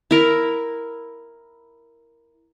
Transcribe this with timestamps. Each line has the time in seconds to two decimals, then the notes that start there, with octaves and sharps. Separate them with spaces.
0.11 E4 A#4